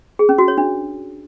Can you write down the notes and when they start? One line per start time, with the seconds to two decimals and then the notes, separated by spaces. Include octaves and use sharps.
0.19 G#4
0.29 C#4
0.38 F#4
0.48 C#5
0.58 D4